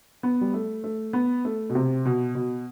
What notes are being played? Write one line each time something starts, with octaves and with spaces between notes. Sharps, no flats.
B3
G3
A3
A3
B3
A3
B2
C3
B2
B2